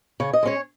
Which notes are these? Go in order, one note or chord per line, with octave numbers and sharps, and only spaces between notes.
C#3 C#5
D#5
G#3 C#4 C#5